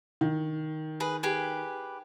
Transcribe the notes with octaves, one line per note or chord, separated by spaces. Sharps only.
D#3
G#4 B4
G4 G#4 B4